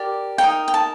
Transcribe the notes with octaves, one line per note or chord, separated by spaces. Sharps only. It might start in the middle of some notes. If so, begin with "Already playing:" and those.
Already playing: G4 A#4 D5
D#4 A#4 D#5 G5
G5
A5